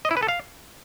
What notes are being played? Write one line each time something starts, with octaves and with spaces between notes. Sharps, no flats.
D#5
E4
B4
A4
F5